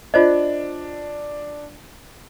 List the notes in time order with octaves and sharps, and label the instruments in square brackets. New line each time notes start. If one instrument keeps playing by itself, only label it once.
[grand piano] D4 [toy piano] F4 C5 D#5